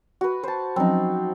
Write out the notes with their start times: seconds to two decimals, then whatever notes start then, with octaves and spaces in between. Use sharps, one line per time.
0.21 F#4 B4
0.43 C5 A5
0.76 F3 F#3 C4 C#4 D#4